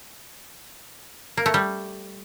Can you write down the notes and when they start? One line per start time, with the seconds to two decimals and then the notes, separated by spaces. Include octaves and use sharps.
1.37 A#3
1.46 A3
1.54 G3